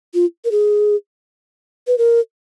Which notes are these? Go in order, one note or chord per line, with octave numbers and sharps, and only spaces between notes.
F4
A#4
G#4
B4
A#4